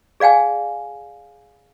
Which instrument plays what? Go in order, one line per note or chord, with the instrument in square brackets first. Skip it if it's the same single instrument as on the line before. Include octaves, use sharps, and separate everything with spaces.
[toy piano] G#4 D5 F5 G5 G#5